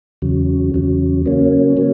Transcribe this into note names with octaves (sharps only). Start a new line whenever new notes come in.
E2 C#3 F#3
E2 C#3 F#3
C#3 F#3 A#3 C#4
F#3 A#3 C#4